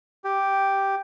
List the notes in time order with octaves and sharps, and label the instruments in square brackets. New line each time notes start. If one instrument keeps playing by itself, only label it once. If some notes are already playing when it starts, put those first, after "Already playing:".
[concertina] G4